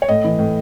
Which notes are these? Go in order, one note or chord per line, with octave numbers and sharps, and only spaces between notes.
C#5
A2 D#5
E3
A2